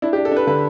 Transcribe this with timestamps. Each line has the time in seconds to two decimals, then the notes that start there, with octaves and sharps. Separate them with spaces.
0.02 D4 E4
0.13 G4
0.17 D4
0.25 A4
0.32 D4 B4
0.47 D3 B4